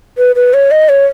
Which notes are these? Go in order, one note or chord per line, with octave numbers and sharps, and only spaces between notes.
B4
B4
C#5
D#5
C#5